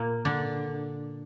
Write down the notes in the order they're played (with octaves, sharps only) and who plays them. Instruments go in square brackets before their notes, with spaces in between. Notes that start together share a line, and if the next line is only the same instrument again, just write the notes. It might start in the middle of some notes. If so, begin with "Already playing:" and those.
Already playing: [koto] A#2 A#3
D3 D4